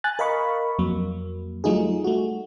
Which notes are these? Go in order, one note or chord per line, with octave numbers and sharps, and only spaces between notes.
G#5 F#6 A6
A#4 D#5 F5 B5 C#6
F2 F#3 A#3
F#3 G3 A3 D#4 F4 G#4
A3 F#4